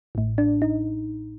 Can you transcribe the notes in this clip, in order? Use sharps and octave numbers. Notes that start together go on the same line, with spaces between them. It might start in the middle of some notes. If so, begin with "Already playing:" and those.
A1 A2
D4
D#4